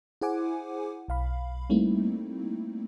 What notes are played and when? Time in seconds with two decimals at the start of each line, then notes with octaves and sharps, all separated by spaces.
0.22 E4 G#4 C5 F#5 G#5 D6
1.08 B1 F5 B5
1.70 G3 A3 A#3 C4 D#4 E4